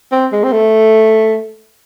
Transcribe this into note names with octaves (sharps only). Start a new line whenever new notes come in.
C4
G#3
C4
A3